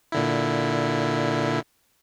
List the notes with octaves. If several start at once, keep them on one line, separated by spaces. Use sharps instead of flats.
A#2 D3 E4